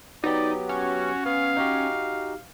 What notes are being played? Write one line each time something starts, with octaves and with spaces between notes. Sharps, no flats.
F#3 B3 D#4 G4 D5
C#4 F#4
B3 F5
D#4 F#4 G4